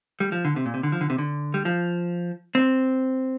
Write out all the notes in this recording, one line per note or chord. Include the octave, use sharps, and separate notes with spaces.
G3
F3
D3
C3
A#2
C3
D3
F3
D3
C3
D3
G3
F3
C4